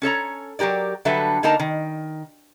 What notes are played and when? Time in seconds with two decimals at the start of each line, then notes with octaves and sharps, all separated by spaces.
0.02 C#4 A4 C#5 A#5
0.59 F#3 G3 G4 A#4 D5
1.05 D3 F#3 G3 A4 B4 E5
1.43 D3 A#3 D#4 A#4 A5
1.60 D#3